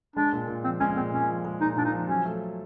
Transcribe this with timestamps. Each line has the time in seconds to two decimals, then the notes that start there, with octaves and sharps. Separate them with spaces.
0.16 G#3 D4
0.33 A#2
0.48 A#2
0.64 F3 C4
0.80 G#3 C#4
0.96 A#2 C4
1.12 A#2 C#4
1.29 F3
1.45 G#3
1.61 A#2 D#4
1.77 A#2 D4
1.85 D#4
1.92 F3
2.09 F#3 C#4
2.26 A3